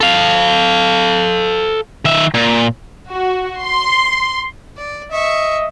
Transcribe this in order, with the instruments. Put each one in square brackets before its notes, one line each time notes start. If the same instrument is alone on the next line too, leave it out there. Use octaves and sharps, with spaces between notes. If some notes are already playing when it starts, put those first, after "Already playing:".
[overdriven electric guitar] A4 F5
D#3 E5
A#2
[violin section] F#4
C6
[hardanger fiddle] D5
[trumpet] D#5 [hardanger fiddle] E5 C#6